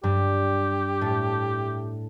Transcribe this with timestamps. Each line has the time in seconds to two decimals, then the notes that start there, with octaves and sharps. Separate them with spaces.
0.03 G2 G3 G4
1.01 A2 A3